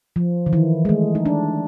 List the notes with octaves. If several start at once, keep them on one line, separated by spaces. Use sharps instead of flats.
F3
D#3
E3
G#3
A3
D#4
D4